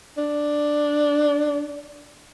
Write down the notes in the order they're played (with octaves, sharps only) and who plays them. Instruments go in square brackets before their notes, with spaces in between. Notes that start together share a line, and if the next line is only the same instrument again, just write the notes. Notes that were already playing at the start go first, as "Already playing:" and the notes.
[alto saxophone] D4